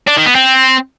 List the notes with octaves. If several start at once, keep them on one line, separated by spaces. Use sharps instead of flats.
D4
D#3
B3
C4